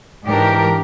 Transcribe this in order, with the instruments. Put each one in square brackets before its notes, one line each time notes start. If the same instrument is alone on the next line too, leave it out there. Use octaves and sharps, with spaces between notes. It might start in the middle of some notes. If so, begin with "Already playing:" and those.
[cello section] G#2 E3 D4 G4 A#4